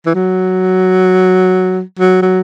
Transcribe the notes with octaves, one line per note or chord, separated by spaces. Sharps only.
E3
F#3
F#3
F#3